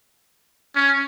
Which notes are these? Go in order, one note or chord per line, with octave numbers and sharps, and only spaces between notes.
C#4